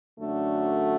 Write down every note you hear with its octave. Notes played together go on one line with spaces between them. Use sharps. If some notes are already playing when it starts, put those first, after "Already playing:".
F#2 D3 A3 D4 F#4